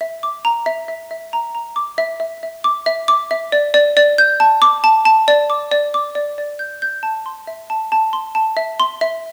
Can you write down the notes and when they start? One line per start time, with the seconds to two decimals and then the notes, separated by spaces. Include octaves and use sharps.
0.01 E5
0.23 D6
0.45 A#5
0.66 E5
0.88 E5
1.11 E5
1.33 A#5
1.55 A#5
1.76 D6
1.98 E5
2.20 E5
2.43 E5
2.64 D6
2.86 E5
3.08 D6
3.31 E5
3.52 D5
3.74 D5
3.97 D5
4.18 G6
4.40 A5
4.62 D6
4.84 A5
5.05 A5
5.28 D5
5.50 D6
5.72 D5
5.94 D6
6.15 D5
6.38 D5
6.59 G6
6.82 G6
7.03 A5
7.26 C6
7.47 E5
7.70 A5
7.92 A5
8.13 C6
8.35 A5
8.57 E5
8.80 C6
9.01 E5